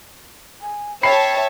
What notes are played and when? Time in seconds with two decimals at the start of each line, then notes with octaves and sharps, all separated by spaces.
0.61 G#5
1.03 C#5 E5 G5 A5 B5 C7